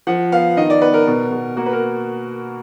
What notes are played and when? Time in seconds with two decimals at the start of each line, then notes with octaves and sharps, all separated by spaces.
0.07 F3 F#5
0.32 B3 F5
0.57 D#3 D#5
0.70 D5
0.82 B3 B4
0.94 A#4
1.07 B2
1.31 B2
1.57 A#3 F#4
1.66 B4
1.73 A#4